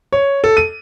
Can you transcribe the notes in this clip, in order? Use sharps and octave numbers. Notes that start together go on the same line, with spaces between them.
C#5
A4
D#7